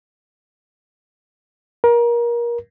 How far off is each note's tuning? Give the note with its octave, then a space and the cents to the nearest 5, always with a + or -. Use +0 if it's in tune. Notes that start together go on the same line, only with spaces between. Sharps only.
A#4 +25